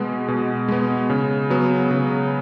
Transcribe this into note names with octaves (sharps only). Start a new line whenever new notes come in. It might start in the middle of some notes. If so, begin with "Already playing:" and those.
Already playing: B2 G#3 B3
B2
G#3 B3
C#3
F#3 B3
C#3